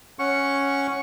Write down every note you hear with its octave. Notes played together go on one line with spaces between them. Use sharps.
C#4 F#5 C#6